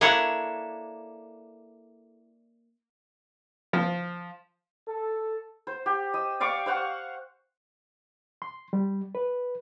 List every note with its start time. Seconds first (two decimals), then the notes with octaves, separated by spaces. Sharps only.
0.01 A#3 D4 E4 A4 C#5 F#5
3.73 F3
4.88 A4
5.67 C5
5.86 G4
6.14 D#5 E6
6.40 D5 F5 C#6 D6
6.66 C5 F5 F#5 C#6
8.42 C6
8.73 G3
9.15 B4